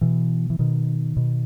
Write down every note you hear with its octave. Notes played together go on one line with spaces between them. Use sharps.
B2 E3
E3
B2 D#3
B2